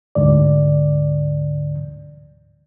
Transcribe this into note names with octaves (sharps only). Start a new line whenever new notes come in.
D2 G#2 D3 D5